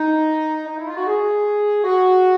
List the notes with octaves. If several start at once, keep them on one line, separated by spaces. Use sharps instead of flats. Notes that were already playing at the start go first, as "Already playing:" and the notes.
Already playing: D#4
D#4
E4
F4
F#4
G#4
F#4